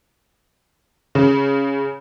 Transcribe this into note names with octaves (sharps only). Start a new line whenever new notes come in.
C#3